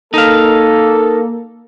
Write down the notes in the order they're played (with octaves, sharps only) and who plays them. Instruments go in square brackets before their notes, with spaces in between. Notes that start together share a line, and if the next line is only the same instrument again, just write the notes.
[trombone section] A#3 [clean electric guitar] D#4 F5 [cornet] A4